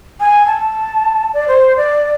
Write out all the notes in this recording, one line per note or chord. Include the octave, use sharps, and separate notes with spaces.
G#5
A5
D5
C5
D5